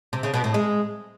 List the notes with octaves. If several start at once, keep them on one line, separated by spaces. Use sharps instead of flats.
C3
C#3
B2
A2
G#3